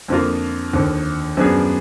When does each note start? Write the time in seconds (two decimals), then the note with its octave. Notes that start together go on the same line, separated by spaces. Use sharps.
0.08 F2 D3 F3 A#3 F4
0.73 D#2 D3 F3
1.37 F#2 F3 B3 D4 G#4